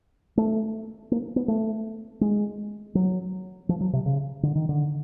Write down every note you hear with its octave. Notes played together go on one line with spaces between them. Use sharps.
A3
A#3
B3
A3
G#3
F#3
F3
F#3
C3
C#3
D3
D#3
D3